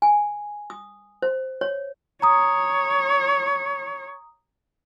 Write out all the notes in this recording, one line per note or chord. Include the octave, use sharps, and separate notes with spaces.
G#5
D#6
C5
C#5
C#5 A#5 D#6